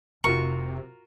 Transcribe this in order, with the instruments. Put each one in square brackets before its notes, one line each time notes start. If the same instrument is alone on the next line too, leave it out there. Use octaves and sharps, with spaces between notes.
[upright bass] F1 [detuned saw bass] C3 [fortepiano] F4 F#4 A#4 [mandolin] C#6